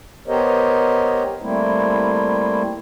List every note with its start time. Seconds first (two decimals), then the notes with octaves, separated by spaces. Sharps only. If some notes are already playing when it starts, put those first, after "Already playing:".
0.28 B3 G4 A#4 C5 C#5 D#5
1.41 G3 A3 A#3 C4 E4